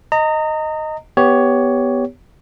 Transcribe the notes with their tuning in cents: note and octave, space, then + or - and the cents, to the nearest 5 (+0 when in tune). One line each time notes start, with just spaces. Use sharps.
D#5 +0 A#5 -30
B3 +0 G4 +5 C#5 +15